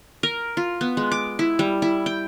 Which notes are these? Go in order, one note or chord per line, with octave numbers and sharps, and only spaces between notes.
A#4
F4
B3
G#3
D6
E4
G3
E4
G5